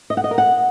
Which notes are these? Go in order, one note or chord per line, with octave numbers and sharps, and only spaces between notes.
D#5
F#5
D#5
A#4
F#5